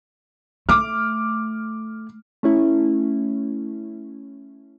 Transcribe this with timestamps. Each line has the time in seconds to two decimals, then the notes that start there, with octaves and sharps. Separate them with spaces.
0.69 A3 D6 F6
2.43 A3 C#4 E4